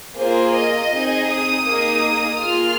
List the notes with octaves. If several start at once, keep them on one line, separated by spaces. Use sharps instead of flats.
A#3 F4 G#4 C5
D#5
C4 D#4 G#4
D#6
A#3 D#4 G#4
A#3 F4 G#4 F6